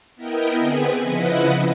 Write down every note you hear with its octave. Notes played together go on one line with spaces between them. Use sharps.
B3 E4 A#4 D#5 G5
D3 B3 C4 G#4 B4 G#5
C#3 F3 E4 B4 D#5 F#5